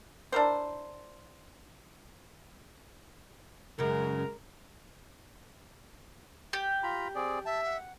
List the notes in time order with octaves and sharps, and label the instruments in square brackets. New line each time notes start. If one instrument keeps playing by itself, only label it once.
[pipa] D4 E4 A#4 C5
[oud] F#2 C#3 [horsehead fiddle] G#3 A#4
[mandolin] G4
[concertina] F4 A#5 B5
C4 G#4 D5
[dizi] E5 [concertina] A5
[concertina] F#5